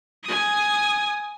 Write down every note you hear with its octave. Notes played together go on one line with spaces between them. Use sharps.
G#5 D#6